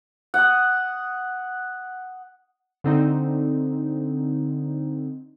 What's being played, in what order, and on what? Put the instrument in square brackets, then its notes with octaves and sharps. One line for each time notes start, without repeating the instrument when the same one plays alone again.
[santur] F#5 D#6
[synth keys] D3 C4 D#4